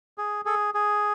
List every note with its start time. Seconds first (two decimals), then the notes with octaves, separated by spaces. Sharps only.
0.18 G#4
0.45 G#4 A4
0.74 G#4